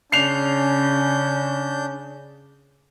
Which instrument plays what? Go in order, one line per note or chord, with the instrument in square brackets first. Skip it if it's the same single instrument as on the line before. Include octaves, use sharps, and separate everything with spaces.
[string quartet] C#3 [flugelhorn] C#4 [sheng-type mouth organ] D4 G6 [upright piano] C7 F7